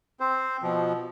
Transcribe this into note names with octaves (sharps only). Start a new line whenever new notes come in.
C4 C5
B2 F3